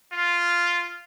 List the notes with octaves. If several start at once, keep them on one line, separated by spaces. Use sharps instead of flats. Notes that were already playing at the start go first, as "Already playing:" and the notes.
F4